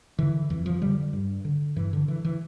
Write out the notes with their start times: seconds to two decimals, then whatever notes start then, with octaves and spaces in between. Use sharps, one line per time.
0.18 D3 E3
0.50 F2 E3
0.66 F3
0.82 D3 G3
1.13 G2
1.45 D3
1.76 G2 E3
1.93 D3
2.08 D3 E3
2.25 E3